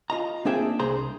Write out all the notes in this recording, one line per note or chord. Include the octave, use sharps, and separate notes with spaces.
F4 D#5 A#5
A#3 C4 D4 G#4 E5 G5
C2 G#4 C5 A#5 C6